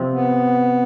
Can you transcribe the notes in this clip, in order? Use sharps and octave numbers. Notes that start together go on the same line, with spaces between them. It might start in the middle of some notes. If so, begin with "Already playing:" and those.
Already playing: C3 F3 C4
B3